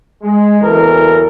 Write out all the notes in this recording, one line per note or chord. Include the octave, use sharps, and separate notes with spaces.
G#3
F#1 E2 E3 A4 A#4